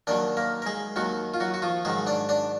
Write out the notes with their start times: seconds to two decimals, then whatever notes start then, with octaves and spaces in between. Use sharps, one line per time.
0.07 D#2 D#3 F#3 D4 D5
0.37 A#3 A#4
0.62 A#4
0.66 G#3 G#4
0.96 D#2 D#3 F#3 F#4
1.34 F4
1.40 F#3 F#4
1.54 F#4
1.62 F3 F4
1.85 G#2 D#3 F#3 G#3 G#4
2.07 D4 D5
2.29 D4 D5